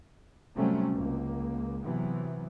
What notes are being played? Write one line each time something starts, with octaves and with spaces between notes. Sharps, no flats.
C3 F#3 G3 A3 C4 C#4
C#2 A#3
C3 E3 F#3 B3